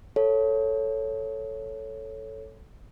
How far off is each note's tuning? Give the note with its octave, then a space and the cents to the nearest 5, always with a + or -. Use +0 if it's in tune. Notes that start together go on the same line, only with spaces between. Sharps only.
A4 +0 C#5 +0 F5 +0